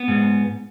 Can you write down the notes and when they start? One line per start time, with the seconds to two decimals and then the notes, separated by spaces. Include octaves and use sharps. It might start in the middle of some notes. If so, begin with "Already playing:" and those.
Already playing: B3
0.08 G#2